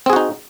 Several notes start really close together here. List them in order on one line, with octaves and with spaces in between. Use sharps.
C4 G#4 F#4 D#4